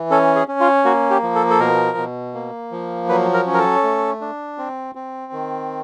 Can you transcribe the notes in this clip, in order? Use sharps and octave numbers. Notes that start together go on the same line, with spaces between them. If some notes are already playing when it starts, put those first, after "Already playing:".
Already playing: E3
C#4 A4
G#4
C#4
F4
A#3 F#4
G4
F3
A4
A4
B2 A#4
B2
A#3
F3
F#3 B4
A#4
C#4
A#4
A4
A3
D4
C4
C4
D#3